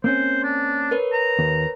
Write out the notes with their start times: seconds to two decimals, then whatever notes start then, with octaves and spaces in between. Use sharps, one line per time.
0.04 A#3 C4 C#4 C5
0.43 D4
0.91 A#4 B4 C#5
1.13 A#5
1.39 D#2